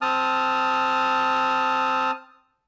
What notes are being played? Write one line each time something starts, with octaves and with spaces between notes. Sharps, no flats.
C4 A5 D#6 F6